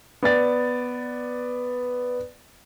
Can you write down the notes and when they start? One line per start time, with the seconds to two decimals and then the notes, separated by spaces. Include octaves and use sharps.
0.23 B3 D5 A6